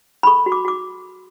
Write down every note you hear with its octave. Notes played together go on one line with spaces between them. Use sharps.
B5
A4 C#6
F#4
D6
F#4 D6